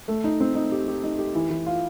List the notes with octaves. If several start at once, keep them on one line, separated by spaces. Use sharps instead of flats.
A3
D#4
C4
D#4
G4
G4
D#4
G4
E3
E3
F4